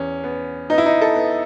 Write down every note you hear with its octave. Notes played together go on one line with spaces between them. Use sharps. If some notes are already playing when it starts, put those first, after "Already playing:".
Already playing: E2 C#4
B3
B3 D#4
E4
D#4
A4
B3